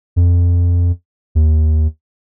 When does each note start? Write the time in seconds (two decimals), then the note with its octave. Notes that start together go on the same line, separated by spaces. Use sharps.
0.16 F2
1.35 D#2